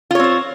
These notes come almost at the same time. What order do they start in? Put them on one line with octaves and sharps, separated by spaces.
F4 C#5 C4 C5